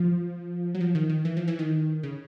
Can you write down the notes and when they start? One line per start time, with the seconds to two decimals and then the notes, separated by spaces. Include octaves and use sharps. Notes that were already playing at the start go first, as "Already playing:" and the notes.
Already playing: F3
0.75 F#3
0.81 F3
0.95 D#3
1.09 D#3
1.25 E3
1.37 F3
1.48 E3
1.59 D#3
2.03 C#3